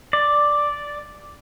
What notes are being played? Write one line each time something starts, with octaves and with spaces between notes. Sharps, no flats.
D5